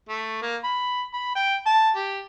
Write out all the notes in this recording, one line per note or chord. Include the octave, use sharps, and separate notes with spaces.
A3
A#3
B5
B5
G5
A5
G4